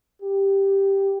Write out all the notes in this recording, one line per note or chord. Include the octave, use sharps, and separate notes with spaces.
G4